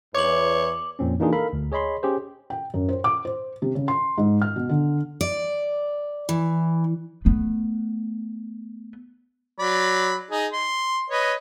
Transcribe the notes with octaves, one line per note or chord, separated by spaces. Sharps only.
E2 B4 C#5 D6 F#7
F2 A#2 C4 C#4
E3 A#3 D4 D#4 F4 G#4
A4 A#4 F5 B5
D2
G#4 C#5 D#5 B5 C6
C#4 G4 G#4 C5
G5
F#2
C5
D6
C5
C3
C#3
C6
G#2
F6
B2
D3
D5
E3
A3 B3
F#3 D5 B5
D#4 G#4
C6
B4 C#5 D#5